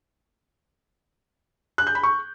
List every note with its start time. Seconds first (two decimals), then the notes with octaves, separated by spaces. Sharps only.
1.78 F#6
1.87 G6
1.95 B5
2.03 C#6